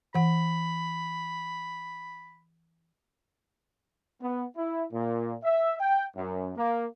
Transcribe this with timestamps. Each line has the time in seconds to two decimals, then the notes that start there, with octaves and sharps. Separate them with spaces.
0.15 E3 F#5 B5
4.21 B3
4.56 E4
4.93 A#2
5.43 E5
5.80 G5
6.16 F#2
6.57 A#3